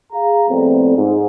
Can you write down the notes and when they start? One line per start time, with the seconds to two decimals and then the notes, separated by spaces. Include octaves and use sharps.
0.12 G#4 F5 A#5
0.48 F2 A2 G3 A3 B3 C4
0.96 G#2